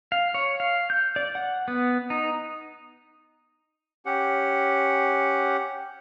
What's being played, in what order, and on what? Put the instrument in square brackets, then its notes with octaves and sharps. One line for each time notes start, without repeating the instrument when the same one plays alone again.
[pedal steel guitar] F5
C#5
F5
G6
D5
F#5
B3
D#4
[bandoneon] C#4 G4 F#5